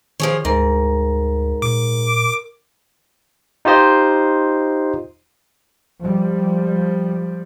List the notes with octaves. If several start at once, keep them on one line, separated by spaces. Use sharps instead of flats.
D#3 F3 G#4 C#5
D2 G#2 A#4
A#2 D6
D#4 F4 G4 C5 D#5
F3 G3